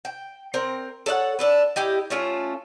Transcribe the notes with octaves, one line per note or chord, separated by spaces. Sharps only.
G5
C4 A#4
A4 C#5 E5 F#5
D4 A4 B4
E4 G4 D#5
A3 C#4 F4